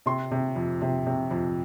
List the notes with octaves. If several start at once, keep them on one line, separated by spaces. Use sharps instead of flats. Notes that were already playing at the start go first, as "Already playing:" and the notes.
C3 C6
C3
F2
C3
C3
F2